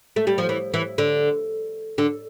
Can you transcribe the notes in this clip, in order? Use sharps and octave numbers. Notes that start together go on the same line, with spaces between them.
A3
G3
F3
E3
E3
D3
D3